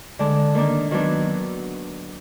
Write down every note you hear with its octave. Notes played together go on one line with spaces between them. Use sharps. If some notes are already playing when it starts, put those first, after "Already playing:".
D3 G#3 D4
D#3 A#3 D4
D#3 F#3 B3 D4